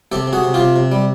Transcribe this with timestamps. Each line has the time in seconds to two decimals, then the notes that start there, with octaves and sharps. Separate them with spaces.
0.12 C3 G4 A4
0.27 C3
0.33 F#4 G#4
0.44 C3
0.54 F4 G4
0.60 C3
0.76 C3
0.92 G3